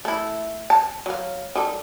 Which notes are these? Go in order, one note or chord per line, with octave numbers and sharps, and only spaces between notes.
A3 E4
A5
F#3 F5
D#3 G3 A4